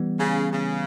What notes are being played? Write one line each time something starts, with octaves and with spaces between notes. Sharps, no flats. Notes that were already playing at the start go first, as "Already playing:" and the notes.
Already playing: E3 G3 B3
C#3
C#3